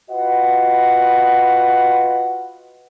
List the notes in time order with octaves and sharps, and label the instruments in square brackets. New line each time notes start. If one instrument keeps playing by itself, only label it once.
[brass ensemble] F4 F#4 B4 D#5 F#5